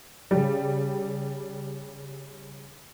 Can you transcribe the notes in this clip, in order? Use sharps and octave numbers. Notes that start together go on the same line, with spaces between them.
C#3 G3